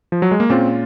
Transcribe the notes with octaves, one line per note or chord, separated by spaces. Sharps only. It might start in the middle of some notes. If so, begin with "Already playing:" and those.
F3
F#3
G#3
A#3
A#2 G#3 C4 C#4 F4